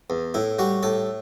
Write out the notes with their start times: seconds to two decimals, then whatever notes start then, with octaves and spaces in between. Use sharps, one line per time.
0.10 E2
0.34 A2 E4
0.59 G3 F#4
0.83 A2 A4